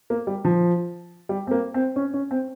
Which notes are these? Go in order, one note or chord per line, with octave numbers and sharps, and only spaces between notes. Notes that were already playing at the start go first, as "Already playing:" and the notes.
A#3
G3
F3
G3
C4
A#3
C4
C#4
C#4
C4